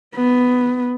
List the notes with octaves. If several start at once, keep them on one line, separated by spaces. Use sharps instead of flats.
B3